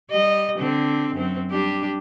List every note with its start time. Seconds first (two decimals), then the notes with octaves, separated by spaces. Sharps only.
0.11 G3 D#5
0.59 D3 C4
1.15 F#2 C4
1.51 G3 D4 G4